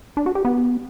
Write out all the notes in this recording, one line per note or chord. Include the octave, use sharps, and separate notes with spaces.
D4
F#4
G4
B3